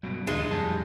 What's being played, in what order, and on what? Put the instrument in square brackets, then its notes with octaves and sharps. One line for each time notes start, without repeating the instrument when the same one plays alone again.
[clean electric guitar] C#2 G2 B2 [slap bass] F#3
[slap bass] D#2 B2 D3 [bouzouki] G#3 [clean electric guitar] D4 D#4 F4
[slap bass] F2 [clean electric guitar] A2 G3 A5